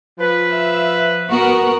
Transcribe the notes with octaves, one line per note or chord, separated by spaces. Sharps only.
F3 B4
E5
B3 F#4 A#4